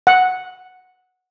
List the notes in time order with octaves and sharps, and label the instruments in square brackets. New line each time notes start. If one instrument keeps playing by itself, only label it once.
[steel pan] F#5